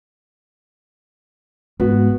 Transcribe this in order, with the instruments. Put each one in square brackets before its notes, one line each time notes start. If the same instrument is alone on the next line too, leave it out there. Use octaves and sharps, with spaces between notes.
[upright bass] G#2 [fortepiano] B3 F#4